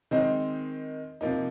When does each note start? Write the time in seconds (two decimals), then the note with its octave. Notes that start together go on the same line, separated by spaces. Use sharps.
0.11 D#3 G#3 C4 D#4
1.21 C3 F3 A#3 D#4